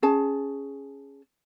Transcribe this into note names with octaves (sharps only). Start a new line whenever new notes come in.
C#4 G#4 A5